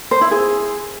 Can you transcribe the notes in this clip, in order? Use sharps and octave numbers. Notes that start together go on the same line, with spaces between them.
C5
E4
G#4